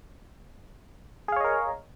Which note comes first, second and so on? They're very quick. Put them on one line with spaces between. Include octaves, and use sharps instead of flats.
G#4 F5 C#5 D#5 A#4